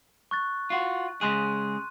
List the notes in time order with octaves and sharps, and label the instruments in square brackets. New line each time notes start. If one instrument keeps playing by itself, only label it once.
[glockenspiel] C#6 F#6 A6
[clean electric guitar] F4 F#4
[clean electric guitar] C#3 G#3 G#4 [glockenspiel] C6 F#6 D#7